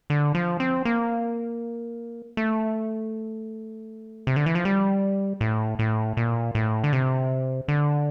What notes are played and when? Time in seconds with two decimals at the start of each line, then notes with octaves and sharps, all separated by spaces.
0.10 D3
0.35 F3
0.60 C4
0.85 A#3
2.37 A3
4.27 C3
4.36 D3
4.46 E3
4.55 F3
4.65 G3
5.41 A2
5.79 A2
6.17 A#2
6.55 A2
6.84 D3
6.93 C3
7.68 D3